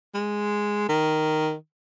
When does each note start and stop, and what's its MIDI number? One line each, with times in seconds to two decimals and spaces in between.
0.14 0.88 56
0.89 1.54 51